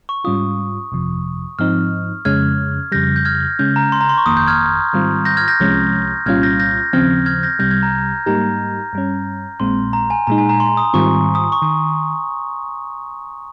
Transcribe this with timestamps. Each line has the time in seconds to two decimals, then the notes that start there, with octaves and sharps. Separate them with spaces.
0.09 C#6
0.24 G#2 G3 C#4 F4 D#6
0.92 G1 F2 C3 F3
1.59 G#2 F3 C4 D#4 F6
2.25 F2 C#3 G#3 C#4 F6 G#6
2.92 F2 C#3 G3 G6 A#6
3.16 G6
3.25 F6 G#6
3.59 C#3 G#3 C#4 G6
3.76 A#5
3.92 C6
4.01 A#5
4.09 C6
4.18 C#6
4.26 G1 F2 D#3 A#3 D#6
4.37 G6
4.47 F6 G#6
4.93 G#2 D#3 G3 C4 F4
5.25 G6 A#6
5.37 F6 G#6
5.48 G6 A#6
5.60 C2 C3 F3 G#3 C#4
6.26 C2 A#2 G3 C#4 F4 F6 G#6
6.43 G6 A#6
6.60 G6 A#6
6.93 D#2 C#3 F3 C4 F6 G#6
7.26 F6 G#6
7.43 G6 A#6
7.59 C2 C3 G3 G6 A#6
7.71 F6 G#6
7.83 A#5
8.26 G#2 G3 A#3 D#4 G4 A#5
8.93 G2 G3 C#4
9.60 A#1 A#2 G#3 C4 C6
9.93 A#5
10.10 G#5
10.27 A#2 G#3 D#4 A#5
10.38 G#5
10.49 A#5
10.60 C6
10.77 D#6
10.93 G#2 D#3 G3 C4 F4 C#6
11.35 D#6
11.52 C#6
11.62 D#3